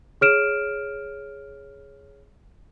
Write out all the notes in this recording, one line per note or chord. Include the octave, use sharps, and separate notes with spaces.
G#4 C#5 F6 D7 E7